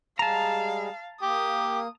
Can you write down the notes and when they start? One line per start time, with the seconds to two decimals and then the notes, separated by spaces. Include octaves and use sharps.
0.19 G3 G#3 G#4 F5 A5 A#5
1.22 A#3 G4 D#6